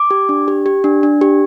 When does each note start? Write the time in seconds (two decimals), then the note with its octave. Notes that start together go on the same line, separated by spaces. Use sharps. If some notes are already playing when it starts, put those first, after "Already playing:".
Already playing: D6
0.11 G4
0.29 D4
0.48 G4
0.66 G4
0.84 D4
1.03 D4
1.21 G4